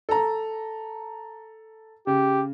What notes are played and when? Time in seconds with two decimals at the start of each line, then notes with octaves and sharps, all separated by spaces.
0.09 A4 A#5
2.07 C#3 G4